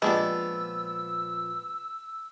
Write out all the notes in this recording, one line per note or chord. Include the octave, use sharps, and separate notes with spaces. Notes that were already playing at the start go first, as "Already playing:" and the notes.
A#2 F3 G#3 B3 D4 G4 D5 E6